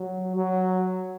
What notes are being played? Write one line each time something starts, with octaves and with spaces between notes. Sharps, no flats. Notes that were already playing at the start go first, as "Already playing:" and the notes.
Already playing: F#3
F#3